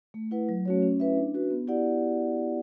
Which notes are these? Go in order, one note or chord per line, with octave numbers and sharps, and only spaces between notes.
A3
E4 B4 F#5
F#3
A3 C#4 F#4 C#5
C#4
E4 B4 E5
D4
F#4 B4
B3
E4 G4 D5 F#5